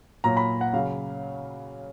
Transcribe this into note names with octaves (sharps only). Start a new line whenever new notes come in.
A#2 F#3 A#5
B5
F#5
C#3 F#3 F5